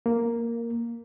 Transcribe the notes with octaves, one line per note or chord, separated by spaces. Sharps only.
A#3